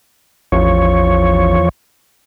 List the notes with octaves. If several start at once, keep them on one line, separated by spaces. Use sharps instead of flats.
A1 E2 F3 C#5